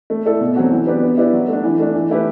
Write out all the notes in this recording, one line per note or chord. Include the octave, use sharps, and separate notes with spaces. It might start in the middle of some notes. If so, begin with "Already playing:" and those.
A3
E4 A4 D5
B2
F#3 C4 F#4
E3
B3 D4 G4 B4
B3
E4 G4 B4 D5
F#3
A3 D4
E3
A3 D4
E3
A3 E4 G4 B4